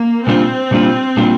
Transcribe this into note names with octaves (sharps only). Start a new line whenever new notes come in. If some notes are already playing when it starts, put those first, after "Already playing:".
Already playing: A#3
A#2 G3 C4 D4 F4
A#2 G3 D4 F4
A#2 G3 D4 F4